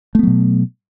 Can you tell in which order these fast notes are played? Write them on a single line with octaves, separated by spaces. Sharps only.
A3 B3 F#3 B2